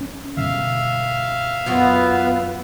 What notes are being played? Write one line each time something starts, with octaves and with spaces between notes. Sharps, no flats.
C#4
G2 B2 D3 E5 F5
F#2 B3 F4 F#4